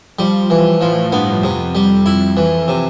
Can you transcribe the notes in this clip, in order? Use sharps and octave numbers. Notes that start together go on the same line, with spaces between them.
F3 G3
E3
A2 F3
G2 B3
F2 C3
G3
F2 E4
F2 E3
C3